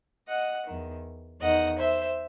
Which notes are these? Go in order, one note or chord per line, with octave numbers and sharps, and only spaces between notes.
D#5 F#5
E2 D#3
E2 D#3 D#5 F#5
C5 E5